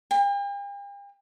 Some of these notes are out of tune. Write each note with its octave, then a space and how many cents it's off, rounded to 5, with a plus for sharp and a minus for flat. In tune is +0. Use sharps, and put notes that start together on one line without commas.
G5 +45